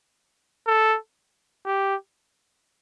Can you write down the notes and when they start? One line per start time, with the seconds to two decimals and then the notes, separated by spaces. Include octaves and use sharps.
0.67 A4
1.66 G4